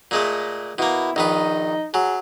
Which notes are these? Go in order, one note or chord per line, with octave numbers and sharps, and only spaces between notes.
A#2 G#3 A3
B2 A#3 E4
A#1 D#3 D#4 B4
F#3 G#4